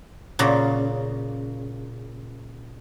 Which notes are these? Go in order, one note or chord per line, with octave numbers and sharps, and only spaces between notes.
A#2 C#3 A#5